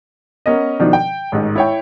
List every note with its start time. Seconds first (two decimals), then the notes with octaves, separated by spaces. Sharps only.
0.46 B3 C#4 A#4 D#5
0.79 B2 D#3 F3 D4 D#4
0.93 G5
1.32 A1 G#2 D#3
1.56 E4 C#5 G5